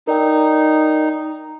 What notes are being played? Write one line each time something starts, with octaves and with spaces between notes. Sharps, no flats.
D#4 A#4 D5 G5